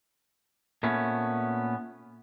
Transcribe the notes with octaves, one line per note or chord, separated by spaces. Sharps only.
A#2 A3 B3 C#4